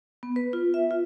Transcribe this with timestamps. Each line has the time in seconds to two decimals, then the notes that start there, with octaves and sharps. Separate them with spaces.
0.23 B3
0.36 B4
0.53 F4
0.74 E5
0.91 F4